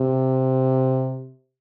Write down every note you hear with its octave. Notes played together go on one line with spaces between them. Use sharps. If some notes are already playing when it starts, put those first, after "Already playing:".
Already playing: C3